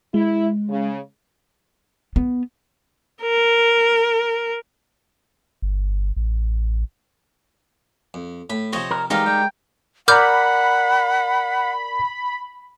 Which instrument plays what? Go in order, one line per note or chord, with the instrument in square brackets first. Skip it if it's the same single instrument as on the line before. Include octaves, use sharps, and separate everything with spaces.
[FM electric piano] G#3 [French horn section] E4
[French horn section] C#3
[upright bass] B3
[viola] A#4
[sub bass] G1
A1
[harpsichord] F2
[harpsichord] A2 [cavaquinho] B5
[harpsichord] C3 F3 C4 [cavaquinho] C5 C#5 D#5
[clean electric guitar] A#4
[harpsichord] E3 G3 [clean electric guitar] G#3 A#4 [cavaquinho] D#4 G4 F5
[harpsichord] G3 [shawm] G5
[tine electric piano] A#4 D5 A#5 [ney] F#5 [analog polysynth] B5 [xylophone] D6 F6 G6